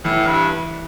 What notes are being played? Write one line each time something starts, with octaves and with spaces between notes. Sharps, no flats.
A2 E3
G2